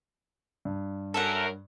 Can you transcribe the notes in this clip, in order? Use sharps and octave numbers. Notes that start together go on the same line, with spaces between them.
G2
F#2 A4 A#4 E5 F#5